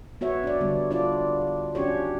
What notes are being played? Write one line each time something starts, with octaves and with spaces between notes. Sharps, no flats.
B3 F#4 C#5 E5
D4 D5
D3 G3 B3
D4 F4 D5
C#4 D4 F#4 G4 C#5